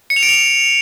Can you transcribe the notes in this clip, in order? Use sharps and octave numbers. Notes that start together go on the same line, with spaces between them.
C#7
F7
D7
F7